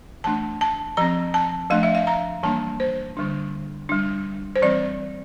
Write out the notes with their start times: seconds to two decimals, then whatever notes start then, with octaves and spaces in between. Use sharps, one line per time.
0.24 E3 A3 D4 A5
0.61 A5
0.97 F3 C4 A#5
1.34 A5
1.70 F3 A3 D4 F5
1.83 E5
1.95 F5
2.07 A#5
2.43 E3 G3 A#3 D4 A5
2.80 C5
3.17 D3 G3 D4
3.89 G3 D4
4.56 C5
4.62 E3 G3 C4 D5